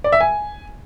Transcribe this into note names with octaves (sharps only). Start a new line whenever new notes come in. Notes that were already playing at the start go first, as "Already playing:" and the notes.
D5
E5
G#5